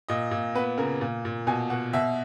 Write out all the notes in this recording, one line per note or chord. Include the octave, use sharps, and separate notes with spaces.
A#2 D#5
A#2
B3 B4
C#3 A#4
A#2
A#2
B2 G#5
B2 F#5
B2 E5